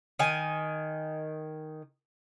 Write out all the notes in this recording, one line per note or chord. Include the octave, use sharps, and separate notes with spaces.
D#3 G#5